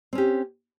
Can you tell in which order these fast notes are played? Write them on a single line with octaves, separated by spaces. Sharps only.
C4 C#4 G4